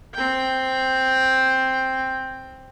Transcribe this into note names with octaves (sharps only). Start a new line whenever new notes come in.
C4 G5